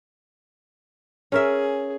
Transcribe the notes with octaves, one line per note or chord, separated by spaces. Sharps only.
C#4 G#4 A#4 E5